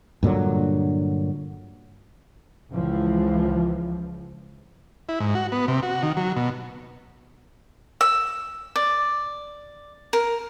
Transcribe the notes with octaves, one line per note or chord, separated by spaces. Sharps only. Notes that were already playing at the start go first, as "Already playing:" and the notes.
G2 A#2 D3 F#3
C#2 E3 F3
E4
G#2
F#4
B3
C3
F#4
D#3
F#3
B2
E6
D5
A#4